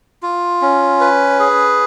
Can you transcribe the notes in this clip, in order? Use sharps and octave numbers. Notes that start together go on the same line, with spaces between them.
F4
C#4
B4
G#4